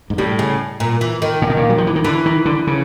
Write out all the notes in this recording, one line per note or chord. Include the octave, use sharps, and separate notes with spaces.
G#2
A2 G3
C#3
A#2
E3
D#3
A#2
B2
A#2
F#3
F3
E3
D#3
D3 E3
D#3
D3
C#3